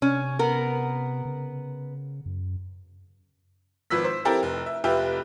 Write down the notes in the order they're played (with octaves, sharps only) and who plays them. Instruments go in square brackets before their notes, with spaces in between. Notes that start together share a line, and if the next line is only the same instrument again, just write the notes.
[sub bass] C3 [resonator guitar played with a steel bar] C#4
[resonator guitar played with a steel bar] B3 A#4
[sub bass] C#3
F#2
[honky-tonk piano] G#1 F3 B4 E6 B6
C5
C4 E4 G4 A4 A#4 A5
F1
E5
F1 F4 G4 B4 E5